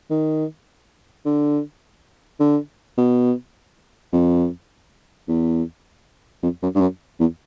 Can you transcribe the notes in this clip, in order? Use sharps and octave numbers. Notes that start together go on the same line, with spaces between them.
D#3
D3
D3
B2
F2
E2
F2
F#2
G2
F#2
E2